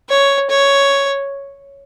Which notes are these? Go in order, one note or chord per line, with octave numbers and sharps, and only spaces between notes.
C#5
C#5